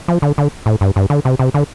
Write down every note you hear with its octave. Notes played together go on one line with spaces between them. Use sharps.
F3
D3
D3
A2
G2
G2
D3
C3
C3
D3